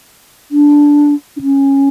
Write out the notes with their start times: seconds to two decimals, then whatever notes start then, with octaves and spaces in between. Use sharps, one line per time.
0.51 D4
1.37 D4
1.41 C#4